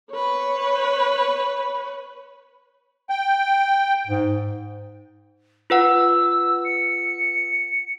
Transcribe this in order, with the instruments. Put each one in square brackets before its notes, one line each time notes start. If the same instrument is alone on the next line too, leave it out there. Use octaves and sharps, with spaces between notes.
[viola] B4 C#5
[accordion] G5
[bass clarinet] G#2
[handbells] F4 B4 F#5 [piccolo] E6
[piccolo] C#7